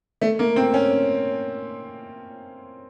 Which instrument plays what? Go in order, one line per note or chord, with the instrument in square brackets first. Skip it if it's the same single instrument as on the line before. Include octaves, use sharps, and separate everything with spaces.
[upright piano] A3
A#3
C4
C#4